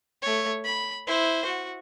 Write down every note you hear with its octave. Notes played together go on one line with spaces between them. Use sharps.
A3 C#5
B5
E4 C5
F#4